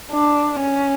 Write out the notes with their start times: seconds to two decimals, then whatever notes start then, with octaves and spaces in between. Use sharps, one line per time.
0.11 D4
0.61 C#4